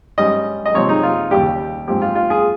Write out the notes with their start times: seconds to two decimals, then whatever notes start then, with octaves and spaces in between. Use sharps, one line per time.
0.18 G#2 G3 C#4 D#5
0.66 D#5
0.74 C3 F3 G#3 C4 C#5
0.89 D#4
1.03 F4
1.31 D#2 C#3 G3 G4
1.88 G#2 F3 C4 G4
2.02 F4
2.15 F4
2.30 G#4